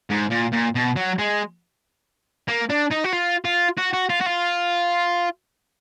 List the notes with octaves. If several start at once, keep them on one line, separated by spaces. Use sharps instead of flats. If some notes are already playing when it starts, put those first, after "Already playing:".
G#2
A#2
A#2
B2
F#3
G#3
A#3
D4
D#4
F#4
F4
F4
F#4
F#4
F4
F#4
F4